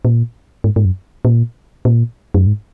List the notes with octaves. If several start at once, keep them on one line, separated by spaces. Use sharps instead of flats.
A#2
G#2
G#2
F#2
A#2
A#2
F#2
G#2